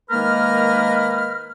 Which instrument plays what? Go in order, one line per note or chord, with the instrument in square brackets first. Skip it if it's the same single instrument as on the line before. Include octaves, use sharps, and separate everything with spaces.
[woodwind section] D#3 G#3 A#3 A#4 B4 F6